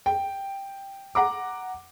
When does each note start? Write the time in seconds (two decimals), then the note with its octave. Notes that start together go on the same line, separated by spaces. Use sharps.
0.06 G5
1.15 F#5 A#5 D6